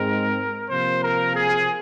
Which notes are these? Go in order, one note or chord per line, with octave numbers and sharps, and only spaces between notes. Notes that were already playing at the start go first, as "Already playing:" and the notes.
Already playing: G#2 G#3 C4 A#4
C3 F3 A#3 C5
A#4
G#4